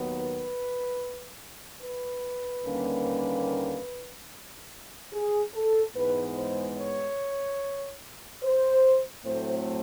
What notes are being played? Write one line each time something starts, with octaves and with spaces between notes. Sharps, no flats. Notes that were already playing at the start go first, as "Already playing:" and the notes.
Already playing: D#2 D#3 F#3 B3
B4
B4
D#2 D3 G3 A#3 C#4
G#4
A4
G#2 E3 G#3 B3 B4
C5
C#5
C5
A2 F#3 A3 C4 C5